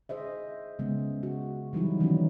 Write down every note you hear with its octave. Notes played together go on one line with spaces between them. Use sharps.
G#4 C5 D#5 E5
C#3 G#3 B3
F#4
E3 F#3 G3 D#4 E4
D#3 E3 F#3 B3 C#4 D#4